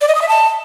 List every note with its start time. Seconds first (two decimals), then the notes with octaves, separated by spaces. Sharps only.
0.01 D5
0.08 D#5
0.15 D#6
0.22 E5
0.29 A5